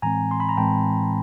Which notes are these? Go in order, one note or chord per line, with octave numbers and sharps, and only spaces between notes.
A2 E3 G#3 C4 G#5 A#5
C6
B5
A#5
A2 E3 G#3 C4 G5 A5